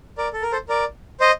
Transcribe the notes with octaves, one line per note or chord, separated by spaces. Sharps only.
A#4 D5
A4
A#4
A4 C5
A#4 D5
C5 D#5